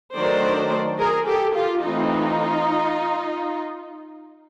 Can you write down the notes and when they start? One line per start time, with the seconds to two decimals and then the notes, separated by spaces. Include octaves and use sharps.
0.14 D#3 F#3 A3 D4 C5 D5
0.99 G#4 A#4
1.27 G4 A4
1.54 F4 G4
1.83 E3 A3 C4 D#4 F4